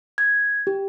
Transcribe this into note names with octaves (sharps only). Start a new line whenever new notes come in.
G#6
G4